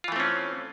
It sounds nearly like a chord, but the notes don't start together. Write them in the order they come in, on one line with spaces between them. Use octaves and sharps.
F4 E3 A3 C4 C#4